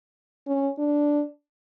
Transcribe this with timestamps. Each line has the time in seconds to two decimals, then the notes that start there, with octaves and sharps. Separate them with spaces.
0.47 C#4
0.79 D4